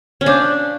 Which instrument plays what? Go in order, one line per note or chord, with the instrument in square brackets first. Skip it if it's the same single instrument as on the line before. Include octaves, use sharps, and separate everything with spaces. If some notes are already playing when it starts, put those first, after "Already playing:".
[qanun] C#4
[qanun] D4 [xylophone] F5 A5 D6 G6